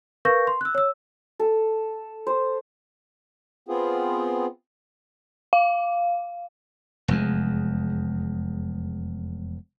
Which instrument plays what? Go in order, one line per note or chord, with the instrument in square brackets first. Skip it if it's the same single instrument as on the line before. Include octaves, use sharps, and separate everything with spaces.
[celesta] A#4 B4 F5 C#6 G6 A#6
C6
E6 F#6
C#5 E6
[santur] A4
C5
[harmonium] B3 C4 F4 G#4
[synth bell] F5
[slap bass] F1 E2 G#3